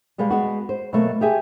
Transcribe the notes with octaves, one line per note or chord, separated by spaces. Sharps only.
B2 G3 G#3 B4 F5
G#3 B3 F#4
C5
B2 F#3 A3 A#3
G4 G#4 E5 G#5